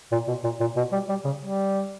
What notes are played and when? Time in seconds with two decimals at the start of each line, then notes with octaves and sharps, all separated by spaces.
0.12 A#2
0.28 B2
0.44 A#2
0.60 A#2
0.77 B2
0.93 G3
1.09 G3
1.25 C#3
1.42 G3